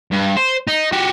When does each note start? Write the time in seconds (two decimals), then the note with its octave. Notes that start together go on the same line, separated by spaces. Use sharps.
0.11 G2
0.36 C5
0.67 D#4
0.93 F#4 G4